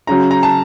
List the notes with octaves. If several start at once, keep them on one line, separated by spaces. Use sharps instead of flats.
C#3 F#3 A#5
A#5
A5